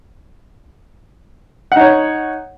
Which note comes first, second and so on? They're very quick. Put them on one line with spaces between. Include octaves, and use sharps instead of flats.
F#5 D#4 C#5